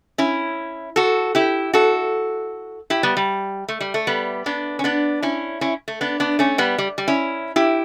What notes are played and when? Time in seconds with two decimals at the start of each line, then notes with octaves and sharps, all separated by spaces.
0.18 C#4 E4
0.96 F#4 A4
1.35 E4 G4
1.73 F#4 A4
2.90 E4 G4
3.03 G3 B3
3.17 G3
3.68 A3
3.80 G3
3.94 A3
4.07 G3 B3
4.46 B3 D4
4.79 C#4
4.84 B3 D4
5.22 C#4 E4
5.61 C#4 E4
5.88 A3
6.01 B3 D4
6.20 B3 D4
6.39 A3 C#4
6.58 G3 B3
6.78 G3
6.98 G3
7.08 C#4 E4
7.56 E4 G4